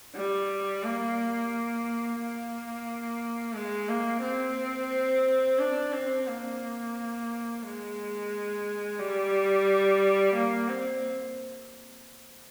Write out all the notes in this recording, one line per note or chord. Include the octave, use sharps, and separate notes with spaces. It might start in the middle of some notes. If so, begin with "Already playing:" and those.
G3
A#3
A#3
G#3
A#3
C4
D4
C4
A#3
G#3
G3
A#3
C4